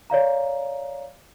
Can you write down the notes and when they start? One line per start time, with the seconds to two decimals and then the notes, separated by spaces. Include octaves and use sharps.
0.10 C#5 D5 F5 A#5